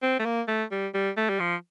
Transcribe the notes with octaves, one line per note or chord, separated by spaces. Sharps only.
C4
A3
A#3
A3
G3
G3
A3
G3
F3